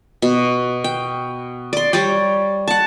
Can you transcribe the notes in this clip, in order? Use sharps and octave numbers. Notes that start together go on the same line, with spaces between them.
B2
G5
D5 C6
G3 C#5 D5 G5
F#5 A5